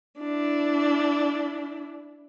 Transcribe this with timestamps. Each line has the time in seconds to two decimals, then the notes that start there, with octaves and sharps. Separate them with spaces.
0.19 D4 E4